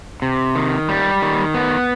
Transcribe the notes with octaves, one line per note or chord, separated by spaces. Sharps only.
C3
D#3
G3
D#3
B3